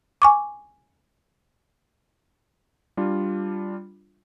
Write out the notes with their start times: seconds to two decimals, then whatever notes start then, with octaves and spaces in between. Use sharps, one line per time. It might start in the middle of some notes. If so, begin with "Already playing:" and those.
0.22 G#5 C#6 D6
2.97 G3 D4 F4